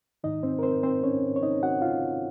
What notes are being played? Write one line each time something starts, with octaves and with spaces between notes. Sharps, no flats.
G#2 D#3 D#4 D#5
C4 C5
A#4
C4 C5
C4 C5
C#4 C#5
C#5
D#4 D#5
F#4 F#5
F4 F5